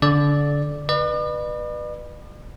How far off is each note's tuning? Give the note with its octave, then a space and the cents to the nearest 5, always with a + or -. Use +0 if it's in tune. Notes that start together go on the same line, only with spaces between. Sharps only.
D3 -25 D5 +0
B4 -10 D5 +45